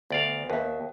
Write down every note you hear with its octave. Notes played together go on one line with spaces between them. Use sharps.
D2 B3 D5 F5
D#2 B4 E5